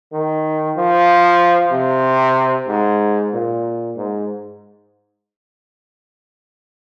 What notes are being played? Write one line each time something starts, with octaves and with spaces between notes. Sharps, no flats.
D#3
F3
C3
G#2
A#2
G#2